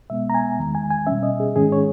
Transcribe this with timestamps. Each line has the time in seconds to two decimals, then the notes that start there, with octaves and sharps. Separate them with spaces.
0.10 B2 G#3 B3 E5
0.30 A#5
0.35 G#5
0.59 E2 D#3 G#3
0.75 G#5
0.90 G#5
1.07 B2 G3 C#4 E5
1.23 D#5
1.40 G#4
1.56 G#2 D#3 G#3 C#4 G#4
1.72 C#5